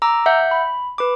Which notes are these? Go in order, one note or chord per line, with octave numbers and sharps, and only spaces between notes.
A#5 D6 E6
E5 F#5 G6
B5
B4 B5 D6